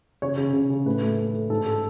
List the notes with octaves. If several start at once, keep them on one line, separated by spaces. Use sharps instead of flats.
C#3 C#5
C#3
C#3
C#3
A2 B4
A3
A3
A3
G#2 A4
A4